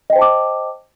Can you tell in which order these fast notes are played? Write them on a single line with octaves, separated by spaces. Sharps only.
D#5 G5 C5 A5 D6